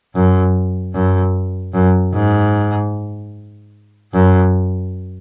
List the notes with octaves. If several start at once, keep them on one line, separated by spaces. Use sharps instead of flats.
F#2
F#2
F#2
G#2
F#2